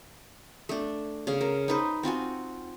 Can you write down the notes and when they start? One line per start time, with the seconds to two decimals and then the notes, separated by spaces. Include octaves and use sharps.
0.69 A3 D4
1.27 C#3 F5
1.41 A#4
1.68 D#4 B4 C5
2.03 C4 F4 F#4 G#5